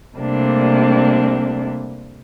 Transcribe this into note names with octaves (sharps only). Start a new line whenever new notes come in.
C3 G3 A3 A#3 C4 D4